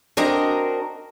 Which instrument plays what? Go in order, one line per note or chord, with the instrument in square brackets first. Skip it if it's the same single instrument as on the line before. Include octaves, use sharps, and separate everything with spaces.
[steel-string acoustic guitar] C4 D4 F#4 A#4 D#5 A#5